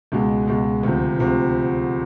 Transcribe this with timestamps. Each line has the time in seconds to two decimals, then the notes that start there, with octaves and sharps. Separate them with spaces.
0.12 C#2 B2 G#3
0.47 C#2 B2 G#3
0.83 D2 C3 F3
1.18 D2 C3 F3